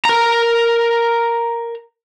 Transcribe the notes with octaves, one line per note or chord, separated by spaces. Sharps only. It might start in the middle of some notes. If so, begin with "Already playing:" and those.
A#4 A#5